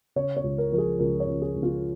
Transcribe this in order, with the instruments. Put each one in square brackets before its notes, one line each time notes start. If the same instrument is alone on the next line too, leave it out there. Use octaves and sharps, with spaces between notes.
[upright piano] C#3 C#5
C#5
C#2
A#4
F3 A#4
G#4
C#2 A#4
C#5
C#3
G#4
C#2
F4